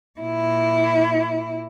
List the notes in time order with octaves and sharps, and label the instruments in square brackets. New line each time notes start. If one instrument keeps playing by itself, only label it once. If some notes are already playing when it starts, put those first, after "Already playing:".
[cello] A#2 E4